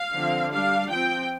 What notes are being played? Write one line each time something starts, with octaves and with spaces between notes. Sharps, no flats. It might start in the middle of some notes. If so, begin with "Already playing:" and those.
Already playing: F5
D3 F3 C4
G3 D4 F5
F3 C4 G5